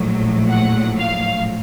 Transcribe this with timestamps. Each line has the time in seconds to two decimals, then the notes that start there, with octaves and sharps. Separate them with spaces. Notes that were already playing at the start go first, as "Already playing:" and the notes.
Already playing: A#1 A2 F#3
0.48 F#5
0.98 F5